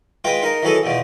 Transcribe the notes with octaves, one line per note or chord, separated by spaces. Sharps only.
G#3 F4 B4 G5
D#4 A#4
E3 F#3 G#4 A4 D#5
E2 B2 F3